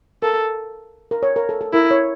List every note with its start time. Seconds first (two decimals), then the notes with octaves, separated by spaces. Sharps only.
0.22 A4 A#4
1.11 A#4
1.23 C#5
1.36 A#4
1.49 A4
1.61 A4
1.73 E4 A#4
1.91 C#5